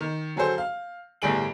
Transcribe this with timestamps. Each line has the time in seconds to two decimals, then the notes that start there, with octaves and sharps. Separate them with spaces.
0.01 D#3
0.36 D3 F#3 G#4 A4 C5
0.58 F5
1.22 G1 A2 G3 G#4 D7 F#7